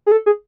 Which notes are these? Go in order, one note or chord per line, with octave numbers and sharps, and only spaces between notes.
G#4
A4
G#4